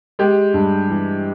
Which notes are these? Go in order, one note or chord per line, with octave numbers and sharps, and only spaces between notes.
G#3 G4
G2
E3